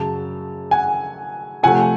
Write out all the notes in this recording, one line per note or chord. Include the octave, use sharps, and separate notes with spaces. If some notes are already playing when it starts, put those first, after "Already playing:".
Already playing: F#2 C#3 F#3 A5
F#5 G#5
C3 F3 A3 F#5 G#5